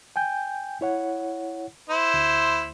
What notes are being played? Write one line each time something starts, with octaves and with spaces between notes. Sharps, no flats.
G5 G#5 G6
E4 C#5 F#5
E4 C5
D2